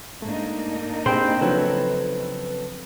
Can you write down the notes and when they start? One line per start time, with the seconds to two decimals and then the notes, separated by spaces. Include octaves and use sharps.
0.22 G#2 A3 A#3 D4 D#4
1.06 C4 G4 G#4 C5 G5 B5 C6
1.41 C#3 F3 F#3 A4 B4 C#5